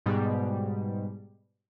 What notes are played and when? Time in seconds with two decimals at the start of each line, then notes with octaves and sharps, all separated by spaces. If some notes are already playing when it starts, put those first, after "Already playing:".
0.06 G#2 B2 G3